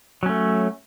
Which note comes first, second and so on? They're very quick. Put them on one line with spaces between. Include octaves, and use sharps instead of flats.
F#3 C#4 A3